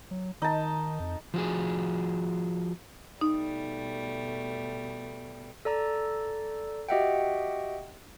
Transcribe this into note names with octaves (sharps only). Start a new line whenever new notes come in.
F#3
D#3 D#4 A5
F2
F3 F#4 G#4
B2 G3 A3 D#4
A4 D5 A#5 E6
F#4 G4 D#5 E5 F#5 G5